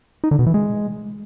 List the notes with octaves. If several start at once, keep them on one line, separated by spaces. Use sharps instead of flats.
D#4
D3
B2
E3
G#3